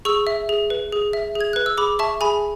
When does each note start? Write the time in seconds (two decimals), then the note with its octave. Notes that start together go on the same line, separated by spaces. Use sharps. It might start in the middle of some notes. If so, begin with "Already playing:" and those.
0.05 G#4 C#6 E6
0.27 E5
0.49 G#4
0.70 B4
0.92 G#4
1.13 E5
1.35 G#4
1.41 G#6
1.53 B4 F#6
1.66 E6
1.78 G#4 B5 D6
1.99 E5 A5 C#6
2.21 G#4 G#5 B5